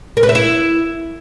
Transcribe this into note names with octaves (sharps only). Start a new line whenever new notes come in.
A#4
B4
E5
E4